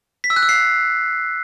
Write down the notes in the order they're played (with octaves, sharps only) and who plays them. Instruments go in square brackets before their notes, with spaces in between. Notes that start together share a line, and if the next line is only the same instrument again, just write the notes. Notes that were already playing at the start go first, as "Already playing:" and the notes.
[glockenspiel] B6
E6
F#6
E6
C7